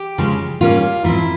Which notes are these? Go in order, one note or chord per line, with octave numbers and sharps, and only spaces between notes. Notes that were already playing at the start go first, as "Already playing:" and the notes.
Already playing: G4
C#3 F3 G#3 C#4
G#2 G3 A#3 C#4 F4
G#2 F3 C4 E4